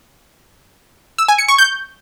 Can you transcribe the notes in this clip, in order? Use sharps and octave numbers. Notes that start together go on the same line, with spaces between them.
E6
G#5
C#7
C#6
G6